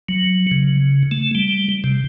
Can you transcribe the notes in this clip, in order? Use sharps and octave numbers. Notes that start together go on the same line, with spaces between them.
F#3
C#3
A3
G3
C3